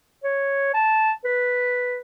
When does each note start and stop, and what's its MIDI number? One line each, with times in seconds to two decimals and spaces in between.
0.23 0.69 73
0.74 1.11 81
1.24 2.01 71